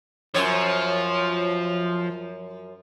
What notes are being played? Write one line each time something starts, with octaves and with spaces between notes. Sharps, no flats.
F#2 F3 C#5